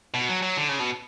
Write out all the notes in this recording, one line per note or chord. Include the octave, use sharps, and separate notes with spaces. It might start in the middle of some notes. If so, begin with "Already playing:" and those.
B2
F#3
F#3
D3
C#3
B2